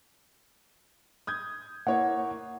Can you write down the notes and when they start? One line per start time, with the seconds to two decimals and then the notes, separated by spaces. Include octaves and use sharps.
1.27 D#6 G6 G#6
1.87 A#3 E4 C#5 F#5